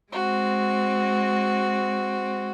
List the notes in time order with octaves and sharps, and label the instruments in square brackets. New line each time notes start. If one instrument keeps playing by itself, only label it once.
[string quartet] G#3 C4 [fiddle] F#4